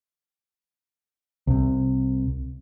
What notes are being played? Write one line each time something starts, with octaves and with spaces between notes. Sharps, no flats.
C2 C3